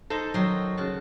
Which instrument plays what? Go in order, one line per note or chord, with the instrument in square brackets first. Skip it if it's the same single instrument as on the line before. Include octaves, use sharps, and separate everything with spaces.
[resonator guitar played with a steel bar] D#4 A4 [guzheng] C5
[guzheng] D#3 D#5 C6 [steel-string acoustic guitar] F#3
[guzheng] C#3 F#4 A5